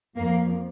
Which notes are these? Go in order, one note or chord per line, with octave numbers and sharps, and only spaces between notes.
F2 F3 A#3